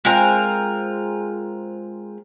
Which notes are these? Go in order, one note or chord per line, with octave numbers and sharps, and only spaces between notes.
G#3 C4 F4 A#4